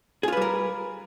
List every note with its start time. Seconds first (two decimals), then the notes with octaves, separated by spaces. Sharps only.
0.23 G#4
0.28 F4
0.32 B4
0.37 G3
0.42 A#4